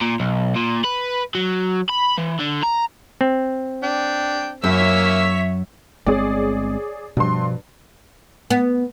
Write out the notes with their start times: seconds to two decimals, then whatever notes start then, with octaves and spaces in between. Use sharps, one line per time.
0.02 A#2
0.20 B1
0.55 A#2
0.84 B4
1.35 F#3
1.89 B5
2.18 E3
2.40 D3
2.63 A#5
3.21 C4
3.83 D4 G5
4.64 F#2 A#3 C#5 E5 E6 B6
6.06 G1 G#3 C4 G#4 C#5 D5
7.17 G2 B2 F3 C6
8.50 B3